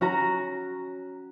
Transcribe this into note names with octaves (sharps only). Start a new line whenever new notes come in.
C#4 F#4 A#5